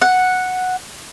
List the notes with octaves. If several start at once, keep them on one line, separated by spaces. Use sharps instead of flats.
F#5